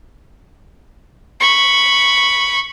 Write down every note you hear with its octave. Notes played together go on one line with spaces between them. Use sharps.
B5 C#6